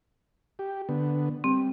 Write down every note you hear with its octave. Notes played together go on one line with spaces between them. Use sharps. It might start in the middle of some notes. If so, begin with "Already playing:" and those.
G4
D3 B3
G3 C4